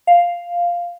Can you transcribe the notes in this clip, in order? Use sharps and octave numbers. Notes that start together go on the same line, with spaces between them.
F5